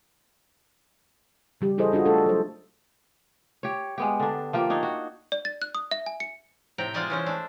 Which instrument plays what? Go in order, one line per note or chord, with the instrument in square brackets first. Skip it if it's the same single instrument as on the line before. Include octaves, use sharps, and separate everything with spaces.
[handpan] C#3 G3 G4
E4 G#4 A4 C5 D#5
G3 D4 F4 F#4
A3 D4 A4
F#3 C5
[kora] G4 C#5
G#3 B3 G4
D3 D4
F3 A#3 G4
D4 D#4 C#5
F#4
[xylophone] D5
A6
F#6
D#6
E5
G#5
C#7
[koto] A2 C3 G5 A#5
G#3 F4 C5 D5 D#5 G#5
E3 C#4 C5
A3 D4